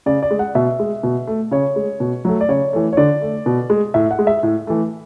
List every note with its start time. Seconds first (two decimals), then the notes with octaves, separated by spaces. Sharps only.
0.06 C#3 D5
0.23 D5
0.31 G#3
0.39 F#5
0.55 B2 E5
0.79 G#3
1.03 B2
1.27 A3
1.51 C#3 C#5
1.76 G#3
2.00 B2
2.25 F#3 A3
2.41 D5
2.49 C#3 C#5
2.73 E3 A3
2.93 C#5
2.97 D3 D5
3.21 A3
3.46 B2
3.70 G#3
3.94 A2 E5
4.11 F#5
4.19 G#3
4.27 E5
4.43 A2
4.67 E3 A3